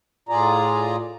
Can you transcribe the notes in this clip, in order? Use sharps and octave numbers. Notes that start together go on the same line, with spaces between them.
A2 F4 G#4 D5 A#5